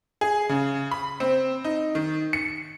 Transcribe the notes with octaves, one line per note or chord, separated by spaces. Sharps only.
G#4
C#3
B5
C4
D#4
D#3
C#7